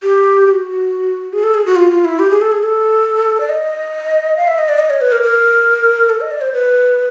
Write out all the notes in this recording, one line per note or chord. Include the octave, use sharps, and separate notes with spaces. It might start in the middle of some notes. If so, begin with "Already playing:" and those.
G4
G4
F#4
G#4
A4
G#4
F#4
F4
F4
E4
G4
G#4
A4
G#4
A4
D5
D#5
F5
E5
D#5
D5
D#5
C#5
B4
A#4
A#4
A4
D#5
D5
C5
B4